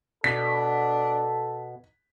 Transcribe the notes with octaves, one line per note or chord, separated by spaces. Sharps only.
B2 D4 A4 B6